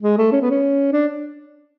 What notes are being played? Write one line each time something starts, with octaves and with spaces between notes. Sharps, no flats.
G#3
A3
C#4
B3
C#4
D4